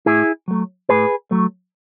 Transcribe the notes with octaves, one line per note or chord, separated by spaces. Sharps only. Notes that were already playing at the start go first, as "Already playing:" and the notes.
A2 E4 G#4
F#3 A3
A2 G#4 B4
F#3 A3